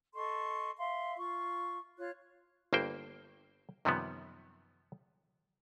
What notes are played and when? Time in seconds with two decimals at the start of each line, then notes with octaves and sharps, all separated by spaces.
0.15 A4 D#5 C6 C#6
0.78 E5 F5 C6
1.17 F4 C#6
1.98 F4 C#5 F#6
2.73 G1 G2 A#3 C5 G5
3.85 F#2 C3 D#3 F3 G3 B3